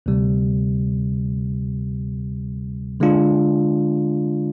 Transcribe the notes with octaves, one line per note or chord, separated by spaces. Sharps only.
D2 C3 G3
D3 G#3 D4 F4